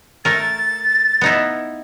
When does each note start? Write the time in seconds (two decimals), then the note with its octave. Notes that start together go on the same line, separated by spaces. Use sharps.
0.25 A3 A#4 A6
1.21 B3 D#4 E4